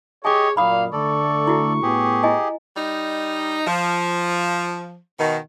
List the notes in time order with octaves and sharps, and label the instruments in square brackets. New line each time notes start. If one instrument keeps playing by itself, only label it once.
[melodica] G4 D#5 [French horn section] G#4 [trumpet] C#5 [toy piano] G#5 D6
[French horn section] F#2 A#2 D5 [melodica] A#3 [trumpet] F5 [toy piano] B5 D#6
[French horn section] D3 A3 [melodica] A4 D5 [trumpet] C#6
[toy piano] E4 F#4
[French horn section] A2 B3 [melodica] G4 G#4
[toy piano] E4 D#5 G#5
[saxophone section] G3 D#4
F3
B2 D#3